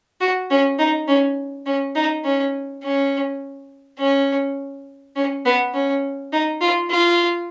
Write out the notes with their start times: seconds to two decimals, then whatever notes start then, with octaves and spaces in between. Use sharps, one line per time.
0.21 F#4
0.50 C#4
0.79 D#4
1.08 C#4
1.66 C#4
1.95 D#4
2.24 C#4
2.83 C#4
3.99 C#4
5.16 C#4
5.45 B3
5.74 C#4
6.32 D#4
6.61 F4
6.90 F4